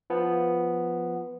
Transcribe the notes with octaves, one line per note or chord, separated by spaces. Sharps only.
F3 B3